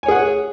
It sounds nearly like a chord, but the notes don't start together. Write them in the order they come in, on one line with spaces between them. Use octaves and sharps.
G#5 C#5 G#4 F#5